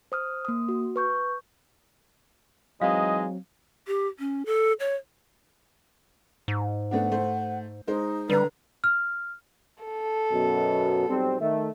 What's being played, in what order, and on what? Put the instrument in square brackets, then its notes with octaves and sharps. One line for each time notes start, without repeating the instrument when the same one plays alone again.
[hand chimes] C5 D#6 F6
A#3 D#6
F#4
B4 C#6 G6
[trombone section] E3 G#3 D#4 [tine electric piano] F#3 C4 [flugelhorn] D#5 [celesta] F5
[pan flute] G4
C#4
A4
C#5
[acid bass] G#2
[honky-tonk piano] A3 B3 D4 [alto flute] F#5
[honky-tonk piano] A3 C5
[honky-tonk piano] G#3 C5 [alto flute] D#4
[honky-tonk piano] D3 A#5 [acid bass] G3 [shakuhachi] B4
[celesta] F6
[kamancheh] A4
[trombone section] F#2 B2
B1 G3 C4
D#3 A3